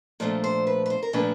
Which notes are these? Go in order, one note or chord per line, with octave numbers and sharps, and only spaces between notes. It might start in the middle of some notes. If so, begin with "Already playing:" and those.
A#2 F3 A3 D4 C5
C5
B4
B4
C5
A#4
A#2 F3 A3 D4 B4